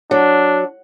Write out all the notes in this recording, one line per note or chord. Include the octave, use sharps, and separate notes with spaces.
F#3 D4